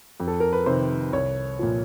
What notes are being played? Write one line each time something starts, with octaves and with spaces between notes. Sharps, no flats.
F2
A4
A#4
B4
C3 D#3 C5
C2 C#5
A#2 F3